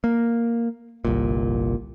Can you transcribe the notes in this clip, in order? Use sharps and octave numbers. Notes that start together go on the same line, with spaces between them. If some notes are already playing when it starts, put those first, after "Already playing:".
A#3
G1 C2 A#2